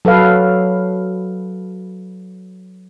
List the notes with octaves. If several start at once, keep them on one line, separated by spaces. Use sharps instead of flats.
F#3 A4 B4 F5